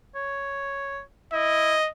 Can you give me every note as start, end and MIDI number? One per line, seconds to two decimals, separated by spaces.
0.15 1.00 73
1.33 1.74 64
1.33 1.90 75